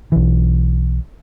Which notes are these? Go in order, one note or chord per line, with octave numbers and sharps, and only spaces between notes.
B1 E3